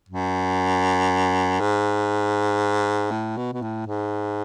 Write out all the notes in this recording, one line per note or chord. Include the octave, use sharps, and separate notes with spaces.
F#2
G#2
A2
B2
B2
A2
G#2